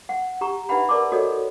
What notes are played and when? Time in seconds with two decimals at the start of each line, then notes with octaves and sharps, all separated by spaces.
0.09 F#5
0.41 G4 A#5 C#6
0.69 D#4 B4 E5 F#5 B5
0.89 A#4 D5 A5 C6 D6
1.12 F#4 A4 C#5 D#5